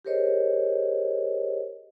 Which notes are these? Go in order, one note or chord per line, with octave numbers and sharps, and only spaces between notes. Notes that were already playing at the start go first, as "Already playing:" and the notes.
G4 G#4 A#4 C5 C#5 D#5